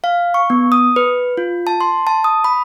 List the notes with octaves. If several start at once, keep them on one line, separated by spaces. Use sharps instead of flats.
F5
C#6
B3
D#6
B4
F4
A5
C6
A5
D#6
B5